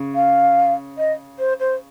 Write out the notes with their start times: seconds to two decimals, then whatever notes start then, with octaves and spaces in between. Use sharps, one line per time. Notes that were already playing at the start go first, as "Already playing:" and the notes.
Already playing: C#3
0.15 F5
0.98 D#5
1.39 C5
1.60 C5